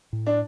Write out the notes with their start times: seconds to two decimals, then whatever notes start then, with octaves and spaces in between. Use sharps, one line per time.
0.13 A2
0.26 D4